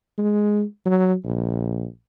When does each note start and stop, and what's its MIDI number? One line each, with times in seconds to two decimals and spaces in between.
0.18 0.64 56
0.85 1.14 54
1.24 1.85 34